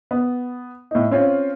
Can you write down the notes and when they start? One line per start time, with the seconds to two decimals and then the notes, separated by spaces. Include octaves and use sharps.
0.11 B3
0.91 A2 D#4
1.11 C4 C#4 F4